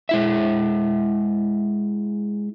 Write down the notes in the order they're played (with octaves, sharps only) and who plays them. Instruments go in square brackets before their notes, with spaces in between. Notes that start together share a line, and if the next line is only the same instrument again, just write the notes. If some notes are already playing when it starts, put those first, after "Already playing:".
[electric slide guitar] G#3 E4 E5